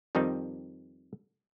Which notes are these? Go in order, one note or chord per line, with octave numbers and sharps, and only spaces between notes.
F2 D#3 G3 C4 D#4